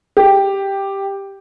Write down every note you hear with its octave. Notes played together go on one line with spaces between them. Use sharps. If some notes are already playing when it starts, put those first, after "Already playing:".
G4